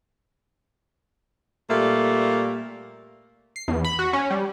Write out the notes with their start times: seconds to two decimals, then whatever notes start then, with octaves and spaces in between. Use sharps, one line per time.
1.70 A#2 G3 A3 A#3
3.56 C7
3.68 E2
3.84 B5
3.99 F#4
4.13 C#4
4.30 G3